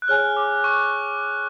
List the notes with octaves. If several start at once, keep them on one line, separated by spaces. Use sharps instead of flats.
F#6
G#4 C#5 G#5 F6
D6
C#6